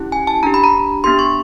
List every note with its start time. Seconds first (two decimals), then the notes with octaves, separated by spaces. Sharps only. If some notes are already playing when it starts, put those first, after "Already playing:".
Already playing: C#4 E4 G4
0.12 G#5
0.27 A5
0.43 D4 G4 A#5
0.54 B5
0.64 A#5
1.04 B3 D4 G4 C6
1.19 C#6